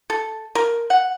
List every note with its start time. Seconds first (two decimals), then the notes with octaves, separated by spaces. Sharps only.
0.10 A4
0.55 A#4
0.90 F#5